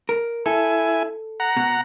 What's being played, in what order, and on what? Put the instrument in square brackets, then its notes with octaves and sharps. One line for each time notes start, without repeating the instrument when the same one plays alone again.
[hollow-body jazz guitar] A#4
[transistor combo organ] E4 G#5 [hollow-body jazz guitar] A4
[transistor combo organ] F#5 A#5
[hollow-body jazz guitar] B2